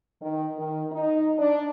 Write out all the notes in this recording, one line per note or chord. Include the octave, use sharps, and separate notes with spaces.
D#3
D#3
D#4
D4